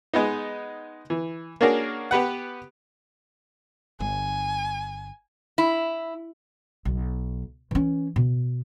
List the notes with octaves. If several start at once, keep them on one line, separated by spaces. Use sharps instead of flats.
G#3 B3 D#4
E3
A#3 C#4 D4 F#4 G#4 A#4
B3 G4 B4 F#5
G1 G#5
E4
B1
E3 C#4
B2